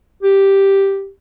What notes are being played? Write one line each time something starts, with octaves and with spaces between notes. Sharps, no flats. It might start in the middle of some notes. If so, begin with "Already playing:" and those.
G4